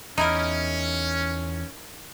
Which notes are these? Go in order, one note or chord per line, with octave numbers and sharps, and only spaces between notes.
E2 C#4 D#4 E4 A#4